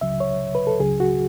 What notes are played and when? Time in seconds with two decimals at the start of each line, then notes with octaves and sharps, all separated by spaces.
0.01 C#2 C#3 F#3 E5
0.20 C#5
0.55 B4
0.67 A4
0.80 C#2 C#3 F#3 G#4
1.00 F#4